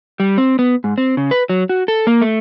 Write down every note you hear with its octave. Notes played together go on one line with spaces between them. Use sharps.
G3
C4
B3
G#2
C4
C#3
B4
F#3
F#4
A4
A#3
A3